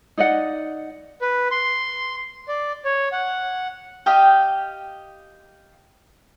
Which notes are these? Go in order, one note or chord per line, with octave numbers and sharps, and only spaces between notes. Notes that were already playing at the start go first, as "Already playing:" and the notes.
D#4 D5 D#5 F#5
B4
C6
D5
C#5
F#5
G4 D#5 F5 G5